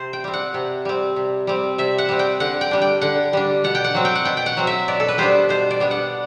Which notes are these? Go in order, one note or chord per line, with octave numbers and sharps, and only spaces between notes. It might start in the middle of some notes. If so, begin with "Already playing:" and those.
Already playing: C3 C5
G5
G3 C4
F#5
C3
G3 C4
C3
G3 C4
C3 E5
F#5
G3 C4
G5
D3 F#5
G5
G3 D4
G5
D3 F#5
G3 D4
B2 F#5
G5
F#5
F#3 C4
G5
F#5
B2 G5
G5
F#5
F#3 C4
E5
B2 D5
A4
B4
G3 B3 D4 C5
B2 C5
D5
G3 B3 D4
F#5